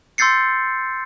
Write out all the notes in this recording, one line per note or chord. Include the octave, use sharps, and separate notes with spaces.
C6 E6 G6 A6 C7 C#7